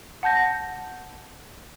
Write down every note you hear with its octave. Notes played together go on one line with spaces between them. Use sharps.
F#5 A5 G6 A#6